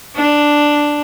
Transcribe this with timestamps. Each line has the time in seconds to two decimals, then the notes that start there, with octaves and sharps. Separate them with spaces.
0.16 D4